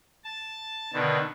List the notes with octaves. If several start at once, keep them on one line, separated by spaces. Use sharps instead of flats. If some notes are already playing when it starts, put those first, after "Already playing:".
A5
B2 D3 D#3